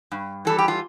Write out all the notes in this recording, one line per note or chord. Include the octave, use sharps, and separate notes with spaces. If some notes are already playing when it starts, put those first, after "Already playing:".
G2
E3 G3 A4
G4
F4